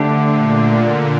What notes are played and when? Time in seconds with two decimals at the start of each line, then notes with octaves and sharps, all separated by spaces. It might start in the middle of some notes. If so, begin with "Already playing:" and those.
Already playing: D3 A3 D4 G4 C5
0.32 A#2